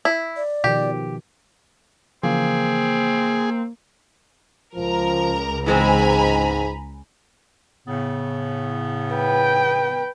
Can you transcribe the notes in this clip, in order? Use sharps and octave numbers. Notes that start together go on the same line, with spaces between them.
E4
D5
B2 D#3 F3 G4
C#3 E3 F3 A#3 C4 G#4
C#2 F3 A#4 A#5
G#2 E3 G#3 C4 G#5 A#5 B5
A2 C#3 B3
B4 G5